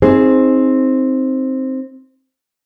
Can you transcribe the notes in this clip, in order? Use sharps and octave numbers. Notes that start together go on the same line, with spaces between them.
C4 D#4 G#4 C5